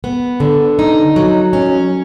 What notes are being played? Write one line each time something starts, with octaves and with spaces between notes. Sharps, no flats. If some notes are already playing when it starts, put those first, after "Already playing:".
B3
D3
D#4
F#3
C#4